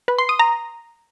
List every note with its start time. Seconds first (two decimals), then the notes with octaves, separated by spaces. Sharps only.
0.08 B4
0.19 C6
0.29 D#6
0.39 A#5